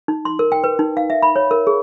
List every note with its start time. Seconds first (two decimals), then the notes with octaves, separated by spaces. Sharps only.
0.08 D#4
0.25 C6
0.39 A#4
0.52 G5
0.64 B4
0.79 D#4
0.97 F5
1.10 E5
1.22 B5
1.36 C#5
1.51 A#4
1.67 G#4